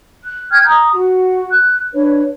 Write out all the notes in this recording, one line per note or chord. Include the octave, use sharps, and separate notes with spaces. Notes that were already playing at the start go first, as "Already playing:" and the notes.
F#6
G5 F6 G6 G#6
A#5 D#6
F#4
F#6
D4 B4 C#5